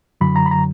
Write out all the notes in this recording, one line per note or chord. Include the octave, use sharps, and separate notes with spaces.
F#2 D3 F#3 B5
A#5
B5
A#5